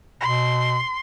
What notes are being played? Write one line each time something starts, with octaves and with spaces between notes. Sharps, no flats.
B2 C6